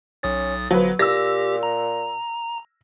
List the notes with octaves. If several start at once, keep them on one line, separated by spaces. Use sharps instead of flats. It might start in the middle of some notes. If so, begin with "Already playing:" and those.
B1 C#4 D#6 A6
G1 F3 F#3 B4
A#2 G4 E6 A#6
A#5